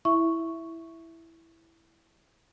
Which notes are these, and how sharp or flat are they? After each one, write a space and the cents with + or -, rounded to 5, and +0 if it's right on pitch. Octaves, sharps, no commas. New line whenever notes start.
E4 +0 E5 +0 C#6 +0